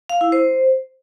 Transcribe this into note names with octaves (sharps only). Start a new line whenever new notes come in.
F5
E4
C5